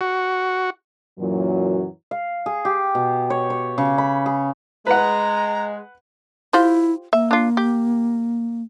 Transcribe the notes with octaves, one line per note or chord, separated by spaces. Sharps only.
F#4
F#2 A#2 E3 F#3
F5
G#4
G4
B2
C#5
C#5
C#3
B5
G#4
G#3 B4 F#5 A#5
E4 F4 G4 C5
A#3 E5
D4 F4
G4